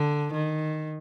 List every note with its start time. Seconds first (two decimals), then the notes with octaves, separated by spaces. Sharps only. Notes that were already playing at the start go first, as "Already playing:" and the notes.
Already playing: D3
0.33 D#3